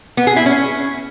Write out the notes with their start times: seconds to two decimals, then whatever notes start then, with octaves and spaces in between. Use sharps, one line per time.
0.17 B3
0.27 G#4
0.36 E4
0.46 C#4